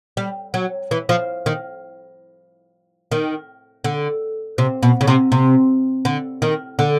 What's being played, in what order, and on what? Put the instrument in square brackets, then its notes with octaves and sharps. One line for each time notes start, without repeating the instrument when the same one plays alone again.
[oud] G3
F#3
E3
F3
D#3
D#3
D3
C3
B2
C#3
C3
C3
D3
D#3
D3